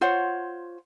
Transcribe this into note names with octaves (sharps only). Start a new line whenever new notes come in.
F4 C5 C#5 F#5